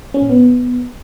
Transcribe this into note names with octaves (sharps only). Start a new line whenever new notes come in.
C#4
A#2
B3